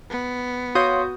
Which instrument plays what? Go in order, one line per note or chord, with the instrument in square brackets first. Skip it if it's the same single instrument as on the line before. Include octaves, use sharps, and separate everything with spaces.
[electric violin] B3
[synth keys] F#4 D#6 G6 [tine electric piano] C#5 F5 C6